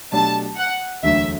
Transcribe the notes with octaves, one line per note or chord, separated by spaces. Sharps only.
B2 F#3 A3 D4 G4 A5
F#5
E1 D2 D3 F#3 A3 E5